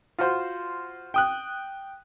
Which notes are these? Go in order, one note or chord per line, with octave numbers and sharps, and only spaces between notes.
F4 F#4 C5
G5 D#6 F#6